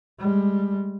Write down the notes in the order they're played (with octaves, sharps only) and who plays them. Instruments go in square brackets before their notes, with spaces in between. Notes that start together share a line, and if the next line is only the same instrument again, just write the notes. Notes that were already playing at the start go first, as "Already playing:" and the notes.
[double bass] G3 G#3